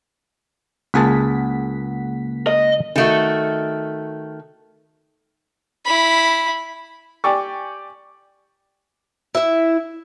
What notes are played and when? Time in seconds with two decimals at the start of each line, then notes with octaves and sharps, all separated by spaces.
0.94 C#2 A#3 G#4 F#5 A5 B6
2.47 D#5
2.96 D#3 A3 F#4
5.86 E4 B5
7.24 G4 D5 G5 G#5 C#6
9.35 E4 E5